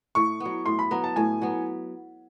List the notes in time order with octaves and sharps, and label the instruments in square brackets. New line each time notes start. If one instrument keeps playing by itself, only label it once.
[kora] A2 [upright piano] C#6
[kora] B3
F#3
[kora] A2 [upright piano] C6
[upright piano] B5
[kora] F#3 B3 [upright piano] A#5
[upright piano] A5
[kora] A2 [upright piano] G#5
[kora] F#3 B3